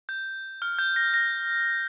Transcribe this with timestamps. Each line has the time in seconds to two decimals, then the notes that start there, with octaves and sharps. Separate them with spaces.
0.09 G6
0.62 F6
0.79 G6
0.96 A#6
1.14 A#6